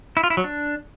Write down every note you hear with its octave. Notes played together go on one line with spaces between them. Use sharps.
E4
F4
E4
F#3
D4